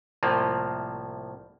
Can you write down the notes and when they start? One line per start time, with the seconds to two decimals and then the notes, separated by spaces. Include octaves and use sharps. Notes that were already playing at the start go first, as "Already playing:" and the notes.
0.23 C2 A2 F3 A#3